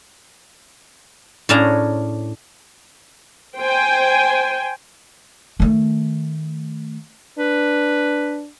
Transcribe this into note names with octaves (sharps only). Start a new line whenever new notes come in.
A2 C#4 D4 G#4 F5 A#5
C5 G5 G#5
D#3 A3
D4 B4